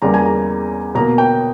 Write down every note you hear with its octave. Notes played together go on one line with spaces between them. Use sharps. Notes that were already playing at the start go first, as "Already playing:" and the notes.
E2 C#3 G3 A#3 A#5
G#5
A#5
B2 A#3 A#5
G5